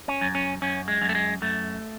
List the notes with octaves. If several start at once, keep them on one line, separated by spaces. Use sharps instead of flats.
C#4
F#2
C#4
F#2 C#4
G#3
F#2
A3
G#3
F#2 A3